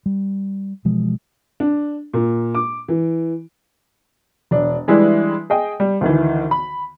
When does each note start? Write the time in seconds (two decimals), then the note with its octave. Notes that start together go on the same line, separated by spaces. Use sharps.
0.06 G3
0.85 B2 E3 F3 G#3
1.60 D4
2.13 A#2
2.55 D6
2.88 E3
4.51 E1 D4
4.88 E3 G3 G#3 D4 E4 B4
5.50 G#4 D#5 G5
5.80 G3
6.01 D2 D#3 E3
6.51 B5